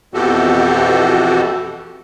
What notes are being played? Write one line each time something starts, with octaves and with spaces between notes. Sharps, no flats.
F2 B2 E3 F#4 G4 A4